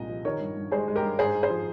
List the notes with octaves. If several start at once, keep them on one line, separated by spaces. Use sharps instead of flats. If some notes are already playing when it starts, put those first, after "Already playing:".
Already playing: C2 A#2 G#3 D#5
F3
D#3 A#4 C#5
G2
G2
G#3 G#4 C5
G#3
G4 A#4
G2
G#2 G#4 C5
G#2
G#4 C5
F3